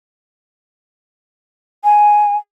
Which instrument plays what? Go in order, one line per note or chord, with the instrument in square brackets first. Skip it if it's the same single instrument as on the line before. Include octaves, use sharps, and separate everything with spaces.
[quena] G#5